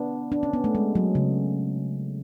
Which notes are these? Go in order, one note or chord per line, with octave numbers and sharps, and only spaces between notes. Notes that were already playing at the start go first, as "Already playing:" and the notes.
Already playing: B3 D4
D4
C#4
B3
A3
G#3
F#3
C#3